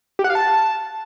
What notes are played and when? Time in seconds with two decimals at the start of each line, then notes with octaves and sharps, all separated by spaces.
0.19 G4
0.24 F#5
0.30 F5
0.35 A5